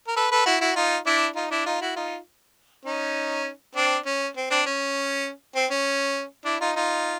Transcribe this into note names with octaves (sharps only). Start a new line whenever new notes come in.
A#4
A4 B4
A4 B4
E4 F#4
E4 F#4
D#4 F4
D4 E4
D#4 F4
D4 E4
D#4 F4
E4 F#4
D#4 F4
C#4 D#4
C4 D4
C#4
C4
C4 D4
C#4
C4
C#4
D4 E4
D#4 F4
D#4 F4